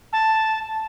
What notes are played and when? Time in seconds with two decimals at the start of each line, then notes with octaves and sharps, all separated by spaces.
0.13 A5